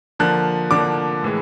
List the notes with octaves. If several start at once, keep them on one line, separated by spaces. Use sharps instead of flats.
D3 F3 A#3 F#6
D3 F3 A#3 D6
A2 E3 G#3